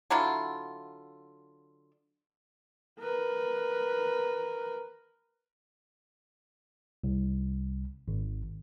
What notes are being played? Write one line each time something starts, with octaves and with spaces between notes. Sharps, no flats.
D3 F#3 E4 F4
A#4 B4
C2
G#1